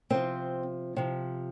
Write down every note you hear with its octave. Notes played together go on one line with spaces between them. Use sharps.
C3 F3 C4
C3 F3